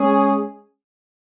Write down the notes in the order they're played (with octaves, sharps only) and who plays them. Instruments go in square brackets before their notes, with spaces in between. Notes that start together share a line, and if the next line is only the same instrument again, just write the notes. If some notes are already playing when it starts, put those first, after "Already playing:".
Already playing: [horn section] G#3 C#4 G#4